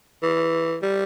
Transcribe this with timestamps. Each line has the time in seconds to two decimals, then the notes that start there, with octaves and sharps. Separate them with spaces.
0.23 E3
0.82 G3